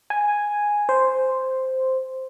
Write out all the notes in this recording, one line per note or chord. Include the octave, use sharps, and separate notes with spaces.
G#5
C5